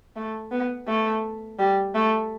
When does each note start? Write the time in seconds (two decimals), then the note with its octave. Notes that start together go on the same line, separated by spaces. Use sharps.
0.16 A3
0.52 B3
0.88 A3
1.59 G3
1.95 A3